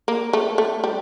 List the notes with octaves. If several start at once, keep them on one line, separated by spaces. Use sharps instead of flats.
A#3
A3
A3
G3